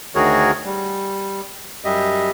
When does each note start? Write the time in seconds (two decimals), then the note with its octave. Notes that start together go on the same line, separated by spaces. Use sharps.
0.15 D2 D#3 F#4 G#4 A#4 C#5
0.65 G3
1.85 F#2 G3 G4 D#5 E5